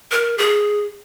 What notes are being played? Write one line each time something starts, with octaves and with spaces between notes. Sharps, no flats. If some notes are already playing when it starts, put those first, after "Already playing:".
A#4
G#4